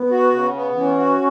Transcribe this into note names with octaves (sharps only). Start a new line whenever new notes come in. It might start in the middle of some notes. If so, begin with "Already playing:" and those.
Already playing: B3
F#4
C#3
B3
E3 C#4
F#4